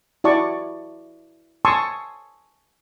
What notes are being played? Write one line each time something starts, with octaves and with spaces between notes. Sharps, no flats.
E4 F#4 D5 A5 C#6
G#5 A5 C6 C#6 D#6 E6